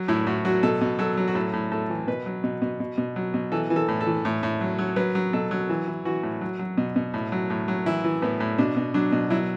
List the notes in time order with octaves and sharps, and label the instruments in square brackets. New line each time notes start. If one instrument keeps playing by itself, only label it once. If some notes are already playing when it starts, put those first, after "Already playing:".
Already playing: [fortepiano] F#3
A2 E4
A2 F#4
F#3 F#4
B2 A4
B2
F#3 A4
F#3
F#4
A2 A4
A2
A2 A4
E3
B2 B4
F#3
B2
B2
B2
B2
F#3
B2
E3 A4
E3
A4
A2
A4
E3
A2
A2
F#3
F#3
F#3 B4
F#3
B2 A4
F#3
E3
E3
E3 F#4
A2
F#3
F#3
B2
B2
A2
F#3
A2
F#3
E3 E4
E3
A2 B3
A2
B2 D4
B2
F#3 D4
B2
F#3 E4